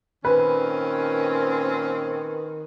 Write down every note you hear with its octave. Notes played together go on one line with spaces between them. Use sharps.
A#2 D#3 C4 C#4 B4